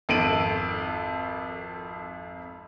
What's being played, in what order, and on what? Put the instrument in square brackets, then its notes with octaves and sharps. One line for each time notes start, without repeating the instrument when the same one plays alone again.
[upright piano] G#1 F2 A4 D7 D#7 F#7